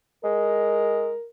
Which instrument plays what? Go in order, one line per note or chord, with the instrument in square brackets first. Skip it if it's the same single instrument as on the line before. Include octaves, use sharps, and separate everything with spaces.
[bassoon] G#3 [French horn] A#4